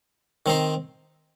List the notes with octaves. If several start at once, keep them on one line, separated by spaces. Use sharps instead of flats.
D#3 C4 D#4 C5